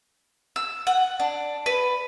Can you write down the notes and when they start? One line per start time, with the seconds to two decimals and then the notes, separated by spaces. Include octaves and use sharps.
0.56 E6
0.87 F#5
1.20 D4
1.66 B4